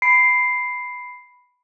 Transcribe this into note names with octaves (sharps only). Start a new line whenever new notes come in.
B5 C7 D7